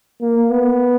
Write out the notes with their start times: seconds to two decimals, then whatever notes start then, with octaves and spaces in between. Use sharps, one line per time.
0.21 A#3
0.51 B3